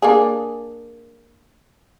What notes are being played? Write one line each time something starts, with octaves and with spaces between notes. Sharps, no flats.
A#3 D4 G#4